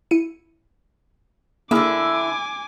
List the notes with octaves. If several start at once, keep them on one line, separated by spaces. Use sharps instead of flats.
E4 C#7 D#7
D3 A#3 E4 G#4 A#4 G#5 D6